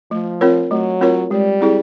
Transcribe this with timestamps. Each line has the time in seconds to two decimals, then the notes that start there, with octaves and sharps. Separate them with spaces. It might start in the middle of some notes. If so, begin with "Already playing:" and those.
0.11 F3 A3
0.41 C4 F4 A#4 C#5
0.71 F#3 A3
1.01 C4 F4 A#4 C#5
1.31 G3 G#3
1.61 C4 E4 G#4